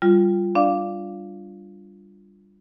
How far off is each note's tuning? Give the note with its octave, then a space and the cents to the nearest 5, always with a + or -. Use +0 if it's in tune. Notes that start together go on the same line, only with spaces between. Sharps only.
G3 +0 F4 +0
D4 +0 D5 +0 F5 +0